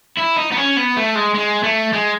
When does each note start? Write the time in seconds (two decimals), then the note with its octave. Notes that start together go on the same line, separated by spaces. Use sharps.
0.18 E4
0.37 D#4
0.52 B3
0.57 C#4
0.77 B3
0.97 A3
1.15 G#3
1.34 G#3
1.63 A3
1.93 G#3